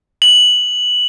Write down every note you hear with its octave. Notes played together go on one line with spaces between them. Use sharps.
F#7